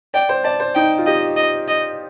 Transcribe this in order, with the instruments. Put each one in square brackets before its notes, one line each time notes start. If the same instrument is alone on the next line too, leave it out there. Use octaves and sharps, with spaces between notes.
[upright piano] D5 [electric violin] G5
[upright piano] C5
[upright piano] D5 [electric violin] A5
[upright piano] C5
[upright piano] D#4 [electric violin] G5
[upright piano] F4
[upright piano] G4 [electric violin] D#5
[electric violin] D#5
D#5